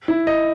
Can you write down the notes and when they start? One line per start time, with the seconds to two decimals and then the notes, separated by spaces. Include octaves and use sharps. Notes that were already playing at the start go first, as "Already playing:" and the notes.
0.08 E4
0.27 D#5